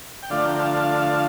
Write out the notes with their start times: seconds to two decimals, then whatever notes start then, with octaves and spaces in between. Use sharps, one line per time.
0.23 G5
0.30 D3 F3 A3 D4 D5 F5
0.45 G5 A#5
0.59 F5 A5
0.74 F5 A5